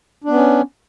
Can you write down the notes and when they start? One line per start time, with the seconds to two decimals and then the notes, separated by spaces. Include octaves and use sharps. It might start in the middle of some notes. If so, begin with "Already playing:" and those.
0.24 D4
0.29 B3
0.34 C#4